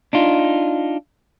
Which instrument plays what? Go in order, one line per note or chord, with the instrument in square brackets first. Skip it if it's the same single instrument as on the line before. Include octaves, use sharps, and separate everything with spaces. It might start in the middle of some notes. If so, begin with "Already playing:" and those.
[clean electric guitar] D4 D#4 F4